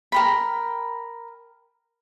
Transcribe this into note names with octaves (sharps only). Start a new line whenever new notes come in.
A#4 G5 B5